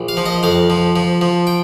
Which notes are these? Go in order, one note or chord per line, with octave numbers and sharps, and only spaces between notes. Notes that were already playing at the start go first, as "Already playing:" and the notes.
Already playing: A#1
F5
F3
D#5
F2 F5
F3
F3
F3
G5